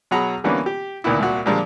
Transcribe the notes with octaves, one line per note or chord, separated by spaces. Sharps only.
B2 F#3 G#4 F#5 A#5 B5
D3 E3 G3 A#3 B3 C#4
G4
D2 A#2 D#3 B3 E4
C2 A#2 F#4
A#2 D3 F3 G3 G#3 A#4